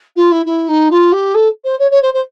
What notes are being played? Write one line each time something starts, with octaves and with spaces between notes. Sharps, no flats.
F4
E4
E4
D#4
F4
G4
A4
C5
C#5
C#5
C5
C5